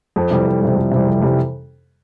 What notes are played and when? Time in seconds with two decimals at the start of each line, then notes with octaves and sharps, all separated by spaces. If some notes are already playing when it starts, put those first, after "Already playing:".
0.16 F2
0.31 C3 E3 G3
0.46 F2
0.61 C3 E3 G3
0.76 F2
0.91 C3 E3 G3
1.07 F2
1.21 C3 E3 G3